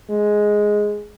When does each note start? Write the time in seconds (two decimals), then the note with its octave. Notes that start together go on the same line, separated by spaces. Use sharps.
0.10 G#3